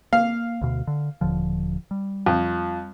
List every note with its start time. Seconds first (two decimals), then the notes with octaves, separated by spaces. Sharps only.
0.13 A#3 F5
0.62 D2 B2
0.87 D3
1.21 D#1 D3 F3
1.91 G3
2.26 F2